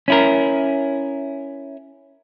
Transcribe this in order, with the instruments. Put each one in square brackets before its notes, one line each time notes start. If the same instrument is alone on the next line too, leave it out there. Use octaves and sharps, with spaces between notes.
[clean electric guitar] C#4 E4 A#4